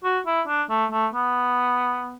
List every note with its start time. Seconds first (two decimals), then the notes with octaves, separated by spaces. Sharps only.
0.04 F#4
0.26 E4
0.48 D4
0.70 A3
0.92 A3
1.14 B3